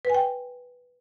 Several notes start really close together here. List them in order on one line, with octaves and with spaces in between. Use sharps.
B4 G#5 G5